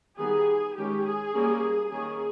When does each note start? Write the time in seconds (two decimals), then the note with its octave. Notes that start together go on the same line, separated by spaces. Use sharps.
0.18 D#3 G3 B3 G#4
0.76 D#3 G#3 C#4 G4
1.05 G#4
1.33 G3 A#3 C#4
1.91 D#3 A#3 C#4 G#4